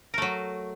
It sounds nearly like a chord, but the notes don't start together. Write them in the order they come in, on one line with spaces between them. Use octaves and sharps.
A#4 A3 F#3